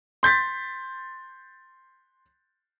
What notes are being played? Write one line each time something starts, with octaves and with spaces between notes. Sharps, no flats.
C6 G6 A6 B6